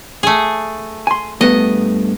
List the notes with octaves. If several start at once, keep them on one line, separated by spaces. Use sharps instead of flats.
A3 G#4
G#5 C6
G2 A3 B3 D#5